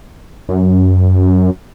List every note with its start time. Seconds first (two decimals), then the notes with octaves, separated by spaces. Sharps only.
0.49 F#2